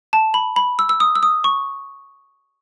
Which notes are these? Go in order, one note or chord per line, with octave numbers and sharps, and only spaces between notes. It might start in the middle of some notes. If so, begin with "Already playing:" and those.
A5
B5
B5
E6
E6
D#6
E6
D#6
C#6